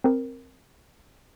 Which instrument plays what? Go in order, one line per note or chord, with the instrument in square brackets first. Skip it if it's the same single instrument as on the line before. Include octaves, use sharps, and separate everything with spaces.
[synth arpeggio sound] C4 A#4